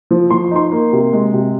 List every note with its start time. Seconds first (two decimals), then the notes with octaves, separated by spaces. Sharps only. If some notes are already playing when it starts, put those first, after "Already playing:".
0.11 F3
0.30 F3 C6
0.51 D#4 C6
0.72 A#3
0.92 C3
1.13 G#3
1.33 C3